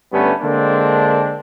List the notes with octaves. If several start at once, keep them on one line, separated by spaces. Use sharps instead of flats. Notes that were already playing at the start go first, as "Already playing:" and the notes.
G2 D3 G3 A3 B3 C#4
D3 G#3 A#3 C4 D4